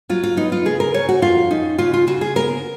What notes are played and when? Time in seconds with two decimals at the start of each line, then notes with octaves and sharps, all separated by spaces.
0.09 F#3 F4
0.23 F4
0.37 B3 D#4
0.52 F4
0.65 C#3 G#4
0.80 A#4
0.94 C#3 C#5
1.09 F#4
1.22 F2 F4
1.51 C#4 D#4
1.78 C#3 F4
1.93 F4
2.07 C#3 F#4
2.21 G#4
2.36 B3 A#4